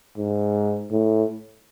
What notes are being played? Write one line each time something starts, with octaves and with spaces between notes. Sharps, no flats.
G#2
A2